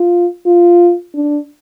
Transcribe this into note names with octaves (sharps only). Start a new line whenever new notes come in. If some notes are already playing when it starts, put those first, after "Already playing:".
Already playing: F4
F4
D4